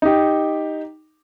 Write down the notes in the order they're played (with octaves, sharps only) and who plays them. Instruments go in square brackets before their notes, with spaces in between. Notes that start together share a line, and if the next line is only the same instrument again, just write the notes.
[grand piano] D#4 G4